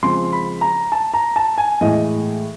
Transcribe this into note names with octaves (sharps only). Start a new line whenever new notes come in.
C#3 F3 G#3 C4 C6
B5
A#5
A5
A#5
A5
G#5
A2 E3 G#3 D#5